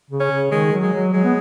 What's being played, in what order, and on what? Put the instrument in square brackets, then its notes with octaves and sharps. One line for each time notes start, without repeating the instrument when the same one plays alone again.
[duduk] C#3
[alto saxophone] C#4
[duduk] C#3
[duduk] D#3 [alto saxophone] G#3
[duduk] F#3
[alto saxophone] G#3
[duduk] F#3
[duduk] F#3 [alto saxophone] G#3
[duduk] B3